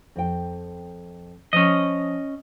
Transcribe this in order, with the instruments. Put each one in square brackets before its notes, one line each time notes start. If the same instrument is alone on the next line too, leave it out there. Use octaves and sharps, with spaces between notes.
[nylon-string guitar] F2 G5
[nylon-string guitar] F3 [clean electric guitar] C#4 D#5